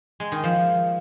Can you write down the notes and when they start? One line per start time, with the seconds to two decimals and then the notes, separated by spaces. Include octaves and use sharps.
0.20 G#3
0.32 D#3
0.44 F3